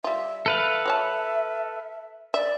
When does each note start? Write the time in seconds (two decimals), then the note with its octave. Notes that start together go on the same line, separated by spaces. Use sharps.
0.04 G3 F4 E5
0.46 A4 B4 E5 F5
0.86 F#3 C#5 A5
2.34 D5 E5